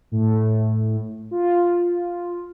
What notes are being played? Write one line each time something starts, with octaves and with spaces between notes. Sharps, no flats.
A2
F4